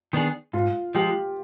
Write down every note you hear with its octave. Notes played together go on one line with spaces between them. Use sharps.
D#3 B3 D4 G#4
G#2 F4
F3 G#3 G4